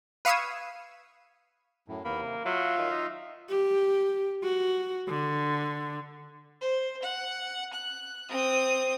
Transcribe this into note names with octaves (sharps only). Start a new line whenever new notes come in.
B4 F5 C#6 D#6 E6 G#6
F#2 A2
D#2 A#3 B3 B5
C3
F#3 F4 E5 F5
D#3
D#4
G4
F#4
D3
C5
F#5
F#6
C4 D#6